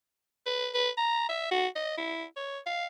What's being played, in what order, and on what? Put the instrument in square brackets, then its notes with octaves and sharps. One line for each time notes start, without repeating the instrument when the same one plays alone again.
[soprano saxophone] B4
B4
A#5
E5
F#4
D#5
E4
C#5
F5